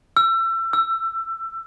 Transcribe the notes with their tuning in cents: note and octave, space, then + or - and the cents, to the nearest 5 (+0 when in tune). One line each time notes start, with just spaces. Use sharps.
E6 +30
E6 +20